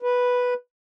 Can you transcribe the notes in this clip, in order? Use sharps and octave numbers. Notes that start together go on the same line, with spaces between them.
B4